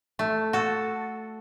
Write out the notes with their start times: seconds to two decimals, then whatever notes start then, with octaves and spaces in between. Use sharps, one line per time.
0.19 A3
0.53 F#4 A4